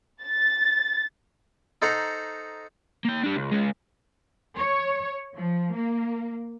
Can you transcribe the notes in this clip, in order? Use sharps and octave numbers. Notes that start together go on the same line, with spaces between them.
A6
D#4 A4 C5 F#5 A#5
A#3 G5
D4 G4
C#2
G#3 C#4
C#5
F3
A#3